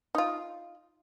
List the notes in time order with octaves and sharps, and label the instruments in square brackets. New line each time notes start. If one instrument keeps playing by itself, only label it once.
[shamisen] D#4 F4